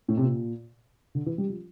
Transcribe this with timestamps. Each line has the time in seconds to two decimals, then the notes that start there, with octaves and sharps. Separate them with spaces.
0.08 A2
0.17 C3
0.24 A#2
1.15 D3
1.26 E3
1.38 G3
1.50 F3